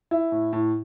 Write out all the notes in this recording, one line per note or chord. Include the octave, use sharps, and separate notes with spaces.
E4
A2
A2